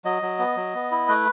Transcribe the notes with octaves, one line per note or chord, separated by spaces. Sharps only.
F#3 D#5
F#3
B3
F#3
B3
E4
A3 B4